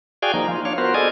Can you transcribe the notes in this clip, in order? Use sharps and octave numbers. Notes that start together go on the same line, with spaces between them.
F#4 G#4 D5 F5 G5 G#5
F3 A#3 D#4
F4
D4 C#5 F5
B3 F4 F#4 A#4 C5
G#4 A4 D5 D#5 G#5